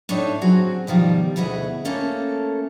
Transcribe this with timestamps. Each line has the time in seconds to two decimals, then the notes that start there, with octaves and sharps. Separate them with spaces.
0.09 A2 D4 D#4 C#5
0.41 F#3 C4 F#4 G#4
0.87 B2 D#3 F3 G3
1.36 D2 B2 E4 G#4 D#5 F#5
1.85 A3 A#3 C#4 A4 F5